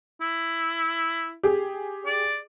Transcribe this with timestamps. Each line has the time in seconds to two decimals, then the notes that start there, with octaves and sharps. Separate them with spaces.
0.21 E4
1.43 G4 G#4
2.06 D5